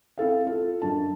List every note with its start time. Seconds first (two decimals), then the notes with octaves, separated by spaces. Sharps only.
0.18 C4 E4 A4 F5
0.47 F4 A4
0.82 F#2 D3 A5